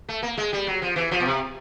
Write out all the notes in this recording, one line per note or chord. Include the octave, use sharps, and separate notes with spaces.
A3
A#3
G#3
G3
F#3
F3
E3
F3
B2
C3